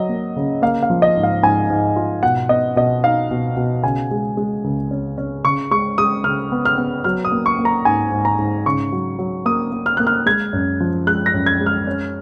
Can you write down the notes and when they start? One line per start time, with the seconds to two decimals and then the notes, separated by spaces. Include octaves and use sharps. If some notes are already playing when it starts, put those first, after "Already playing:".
Already playing: F#3 D#5
0.09 A#3
0.36 C#3
0.62 A#3 F5
0.83 F5
0.90 F3
1.02 D#5
1.17 G#2
1.23 F5
1.43 G#2 G#5
1.70 G#2
1.96 F4
2.23 B2 F#5
2.49 B3 D#5
2.76 B2 D#5
3.04 D#4 F5
3.31 B2
3.57 B2
3.84 C#3 G#5
4.11 G#3
4.37 G#3
4.64 C#2
4.91 C#4
5.18 C#4
5.45 C#3 C#6
5.71 G#3 C#6
5.98 G#3 D#6
6.24 C#3 F6
6.52 B3
6.65 F6
6.78 B3
7.04 F#3 F6
7.25 D#6
7.32 A#3
7.46 C#6
7.59 A#3
7.65 A#5
7.85 G#2 G#5
8.12 G#2
8.25 A#5
8.39 G#2
8.66 C#3 C#6
8.92 F#3
9.19 F#3
9.45 A#3 D#6
9.72 A#3
9.86 F6
9.97 A#3 F#6
10.07 F6
10.26 G#3 G#6
10.53 F#2
10.80 F3
11.07 G#3 F#6
11.26 A#6
11.34 F#2
11.46 G#6
11.61 G#3
11.66 F6
11.87 C#4